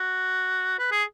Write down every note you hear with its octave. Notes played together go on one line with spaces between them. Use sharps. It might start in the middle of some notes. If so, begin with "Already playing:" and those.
Already playing: F#4
B4
G#4